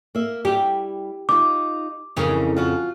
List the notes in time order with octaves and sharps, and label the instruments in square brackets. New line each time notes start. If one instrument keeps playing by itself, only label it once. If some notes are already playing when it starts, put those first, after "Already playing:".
[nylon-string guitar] A#3 E5
[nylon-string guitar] G3 E4 [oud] G4
[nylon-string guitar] D#4 F4 [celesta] D6
[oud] F2 C#3 [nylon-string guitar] E3 D#4 A#4
[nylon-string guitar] F4 F#4 F#5